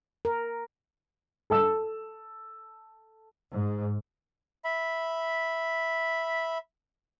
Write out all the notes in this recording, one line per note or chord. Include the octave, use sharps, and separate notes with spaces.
A#4
A4 A5 E6
G#2
E5 B5